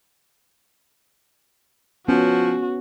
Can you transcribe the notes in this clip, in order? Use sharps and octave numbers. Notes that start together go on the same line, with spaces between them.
F3 B3 C#4 F#4